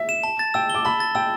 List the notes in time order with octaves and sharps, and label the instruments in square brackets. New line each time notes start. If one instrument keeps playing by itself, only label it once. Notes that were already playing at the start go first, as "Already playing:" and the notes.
Already playing: [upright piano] E5
[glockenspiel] E7
A5
A6
[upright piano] G5 [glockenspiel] E6
[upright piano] D6 [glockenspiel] G7
[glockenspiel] A5 [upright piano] B5
[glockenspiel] A6
[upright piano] G5 [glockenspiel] E6